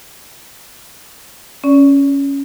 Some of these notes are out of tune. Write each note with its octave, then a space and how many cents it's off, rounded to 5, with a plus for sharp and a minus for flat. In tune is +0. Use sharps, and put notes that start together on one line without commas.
C#4 +0 D5 -35